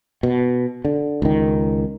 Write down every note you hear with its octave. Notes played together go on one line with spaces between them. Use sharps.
B2
D3
C#2 D#3